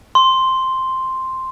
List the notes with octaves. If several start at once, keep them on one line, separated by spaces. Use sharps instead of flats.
C6